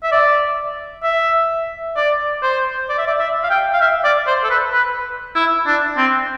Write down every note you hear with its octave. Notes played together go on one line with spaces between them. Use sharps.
E5
D5
E5
D5
C5
D5
E5
D5
E5
F5
G5
F5
E5
D5
C5
A4
B4
B4
E4
D4
C4